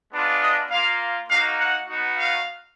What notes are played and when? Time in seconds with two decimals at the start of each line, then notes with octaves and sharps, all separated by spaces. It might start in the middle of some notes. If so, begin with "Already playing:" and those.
0.12 G#3 B3 D4 F4
0.41 D#5
0.70 A#3 F4 F5
1.29 A#3 D#4 F#4 F5
1.59 F#5
1.88 B3 D#4 F#4
2.17 F5